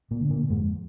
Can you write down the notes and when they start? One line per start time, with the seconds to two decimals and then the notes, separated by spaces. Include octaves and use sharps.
0.11 A#2 A#3
0.21 D3
0.30 A#2 A#3
0.49 F2 G#2 G#3